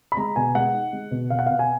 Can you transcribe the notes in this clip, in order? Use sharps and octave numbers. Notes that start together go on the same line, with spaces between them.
B5
G#3 A#5
B2 G#5
G#3 F#5
D#4
G#3
B2
B2 F5
F#5
B2 F5
G#5